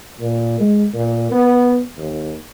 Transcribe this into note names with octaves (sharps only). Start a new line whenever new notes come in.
A#2
G#3
A#2
B3
D#2